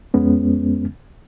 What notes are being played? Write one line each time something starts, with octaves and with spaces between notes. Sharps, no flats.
F2 G#3 B3 C#4